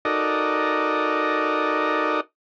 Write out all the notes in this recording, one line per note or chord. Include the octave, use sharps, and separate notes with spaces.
D#4 F#4 A4 A#4 D5 D#5